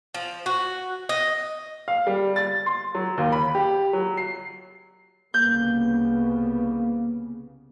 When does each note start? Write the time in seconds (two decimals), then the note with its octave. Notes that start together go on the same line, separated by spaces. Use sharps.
0.14 F3
0.46 F#4
1.09 D#5
1.88 F5
2.07 G3
2.36 A6
2.66 C6
2.95 F#3
3.17 D#2
3.32 B5
3.55 G4
3.93 F#3
4.17 C7
5.34 C2 C#3 A#3 B3 G6